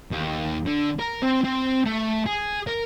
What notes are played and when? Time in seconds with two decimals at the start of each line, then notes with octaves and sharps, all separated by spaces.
0.11 D#2
0.66 D3
1.00 A#4
1.22 C4
1.45 C4
1.86 A3
2.26 G#4
2.67 A#4